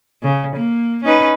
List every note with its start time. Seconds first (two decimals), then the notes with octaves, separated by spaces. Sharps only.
0.23 C#3
0.56 A#3
1.04 C#4 D#4 B4